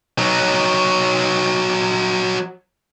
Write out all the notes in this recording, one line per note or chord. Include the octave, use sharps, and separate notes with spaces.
F#3 D#4